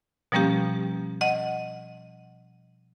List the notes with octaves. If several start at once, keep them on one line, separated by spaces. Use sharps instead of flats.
B2 F3 G3 A#3 C#4 G4
D#5 F#5